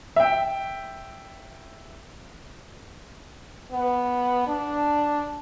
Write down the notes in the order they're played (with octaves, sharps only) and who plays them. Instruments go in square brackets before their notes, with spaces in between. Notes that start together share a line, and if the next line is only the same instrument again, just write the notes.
[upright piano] E5 G5
[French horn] B3
D4